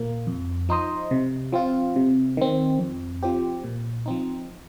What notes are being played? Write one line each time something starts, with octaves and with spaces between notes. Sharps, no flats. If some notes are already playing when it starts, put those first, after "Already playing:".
Already playing: A#2 A#3
F2
F3 D#4 C5 D#5
C3
F3 C4 F4
C3
D#3 C4
F2
F3 C4 G4
A#2
F3 C4 D#4